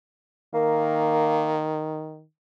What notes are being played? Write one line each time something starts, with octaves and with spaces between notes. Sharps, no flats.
D#3 A#3